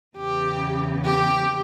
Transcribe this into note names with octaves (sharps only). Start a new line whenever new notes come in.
E2 C#3 E3 G4
G4